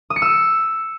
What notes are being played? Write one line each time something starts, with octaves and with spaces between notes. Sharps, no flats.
D#6
C#7
E6